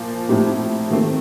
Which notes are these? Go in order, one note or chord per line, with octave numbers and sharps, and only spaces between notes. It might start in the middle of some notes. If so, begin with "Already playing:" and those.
Already playing: A#2 F3 A#3
A2 F3 C4 D#4 G4
D#3 A3 C4